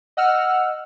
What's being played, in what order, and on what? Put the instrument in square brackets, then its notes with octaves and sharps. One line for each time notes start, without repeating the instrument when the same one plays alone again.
[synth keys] D#5 F#5 E6 F6